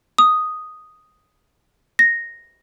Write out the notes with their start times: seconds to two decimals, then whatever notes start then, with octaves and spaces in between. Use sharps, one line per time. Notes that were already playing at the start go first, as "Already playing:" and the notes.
0.18 D#6
1.99 A#6